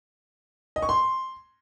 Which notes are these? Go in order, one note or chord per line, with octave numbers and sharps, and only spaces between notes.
D#5
C#6
C6